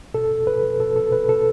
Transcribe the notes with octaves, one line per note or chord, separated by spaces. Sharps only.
B2 A4
B2
B2 B4
B2
B2 A4
B2 A4
B2 B4
B2 A4